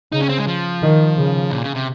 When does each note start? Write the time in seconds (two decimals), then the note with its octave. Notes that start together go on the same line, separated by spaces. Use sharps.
0.12 C#3 D#4
0.21 C#4
0.29 C4
0.38 G#3
0.47 F3
0.82 D#3
1.17 C#3
1.51 A#2
1.63 C#3
1.75 C3